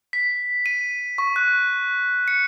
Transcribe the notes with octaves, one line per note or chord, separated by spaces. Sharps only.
B6
D#7
C#6
F#6
C#7